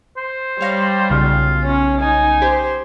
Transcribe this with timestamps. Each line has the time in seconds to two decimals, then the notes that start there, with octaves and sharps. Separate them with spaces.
0.17 C5
0.61 G3 C#5 F5 A#6
1.10 B1 C#3 F4
1.64 C#4
2.02 D#4 G#5
2.42 G4 C5